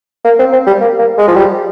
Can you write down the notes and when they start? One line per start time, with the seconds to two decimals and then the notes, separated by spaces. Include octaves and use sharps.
0.25 A#3
0.39 C4
0.53 C4
0.67 G3
0.81 A#3
0.99 A#3
1.18 G#3
1.28 F3
1.36 G3